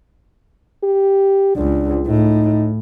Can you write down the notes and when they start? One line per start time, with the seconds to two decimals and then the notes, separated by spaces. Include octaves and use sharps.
0.84 G4
1.56 C#2 D4
2.07 A2 D#4